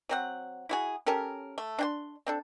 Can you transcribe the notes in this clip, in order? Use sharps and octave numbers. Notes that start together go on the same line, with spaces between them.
F#3 C4 F#5
E4 F#4 G#4
C#4 G4 A4 A#4
A3
D4 G5 C6
C4 D4 A4